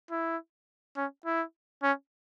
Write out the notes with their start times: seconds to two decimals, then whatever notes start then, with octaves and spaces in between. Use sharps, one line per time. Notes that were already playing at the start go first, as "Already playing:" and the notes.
0.11 E4
0.97 C#4
1.26 E4
1.83 C#4